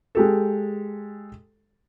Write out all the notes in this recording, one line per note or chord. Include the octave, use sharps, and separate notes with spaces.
G#3 G4 A4